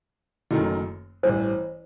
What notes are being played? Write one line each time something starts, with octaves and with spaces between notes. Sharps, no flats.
F#1 F#2 D#3 A3
A1 G2 E3 C5